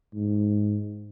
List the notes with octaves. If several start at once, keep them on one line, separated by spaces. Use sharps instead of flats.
G#2